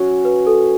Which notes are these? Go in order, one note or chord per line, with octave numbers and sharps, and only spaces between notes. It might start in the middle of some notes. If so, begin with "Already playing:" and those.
Already playing: F#3 C#4 F#4
B4
A4